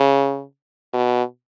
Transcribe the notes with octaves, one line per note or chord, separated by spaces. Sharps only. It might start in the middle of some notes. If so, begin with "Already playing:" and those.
Already playing: C#3
B2